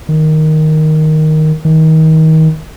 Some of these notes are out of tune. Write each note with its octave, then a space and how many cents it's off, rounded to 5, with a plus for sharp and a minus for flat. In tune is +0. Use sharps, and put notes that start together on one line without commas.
D#3 +0
D#3 +30